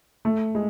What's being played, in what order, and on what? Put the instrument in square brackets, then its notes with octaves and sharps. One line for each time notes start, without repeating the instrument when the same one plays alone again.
[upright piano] A3
G#3